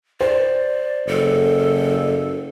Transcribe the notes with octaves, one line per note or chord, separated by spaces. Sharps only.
C5 D5
F#1 A4